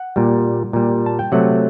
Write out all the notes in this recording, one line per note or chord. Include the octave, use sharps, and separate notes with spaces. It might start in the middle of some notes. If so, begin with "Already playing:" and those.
Already playing: F#5
A#2 G3
A#2 G3
A5
G5
C3 F#3 A3 F#5